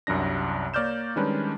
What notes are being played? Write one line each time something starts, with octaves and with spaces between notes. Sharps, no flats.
C2 F#2 G3 D4 A#6
A#3 C#5 D5 F6 G6 E7
D#3 G3 G#3 C#4 D4 B4